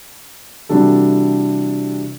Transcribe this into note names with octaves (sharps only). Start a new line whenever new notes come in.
C3 E3 G3 D4 F#4 A4